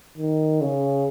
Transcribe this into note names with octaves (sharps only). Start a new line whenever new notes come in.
D#3
C#3